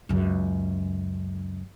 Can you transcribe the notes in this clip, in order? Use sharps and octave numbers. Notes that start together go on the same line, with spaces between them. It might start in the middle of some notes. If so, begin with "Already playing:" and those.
C#2 F#2